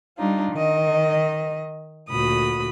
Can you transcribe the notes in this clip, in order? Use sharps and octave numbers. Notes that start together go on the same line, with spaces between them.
G3 D4 D#4 F4
D#3 D#5
D2 A#2 F#4 B5 D#6